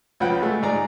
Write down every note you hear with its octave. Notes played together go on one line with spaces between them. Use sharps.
C#2 F3 B4 F#5 G5
G#3 A3
G#2 G#4 D5 A#5